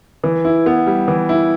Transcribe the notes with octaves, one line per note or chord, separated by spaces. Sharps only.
E3
E4
B3
G3
E3
E4